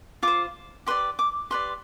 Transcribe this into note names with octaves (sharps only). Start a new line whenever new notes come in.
F4 C5 D6
G4 B4 D5 C6
D6
G4 B4 D5 C6